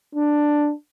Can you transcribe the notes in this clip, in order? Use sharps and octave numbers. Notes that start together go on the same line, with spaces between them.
D4